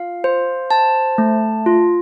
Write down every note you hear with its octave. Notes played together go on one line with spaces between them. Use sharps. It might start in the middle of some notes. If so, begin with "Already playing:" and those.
Already playing: F4 F5
C5
A5
A3
F4